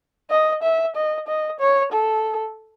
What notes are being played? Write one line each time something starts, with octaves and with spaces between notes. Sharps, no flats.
D#5
E5
D#5
D#5
C#5
A4